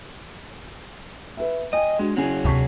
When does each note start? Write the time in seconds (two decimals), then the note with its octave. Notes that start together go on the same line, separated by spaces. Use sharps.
1.37 B4 E5
1.73 D#5 G5 G#5
1.99 G#3 D4 F#4
2.17 C#3 F#3 C#4 E4 G#4
2.44 D2 C3 A5 C#6 B6